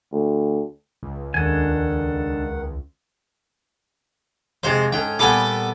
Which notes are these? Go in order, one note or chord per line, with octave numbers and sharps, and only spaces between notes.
D2
C#2
D#2 D#3 D4 A4 F#5 G#5
F2 C3 G#3 C5
G#2 C#4 A4 G5
A#2 G3 B3 A4 G#5 D6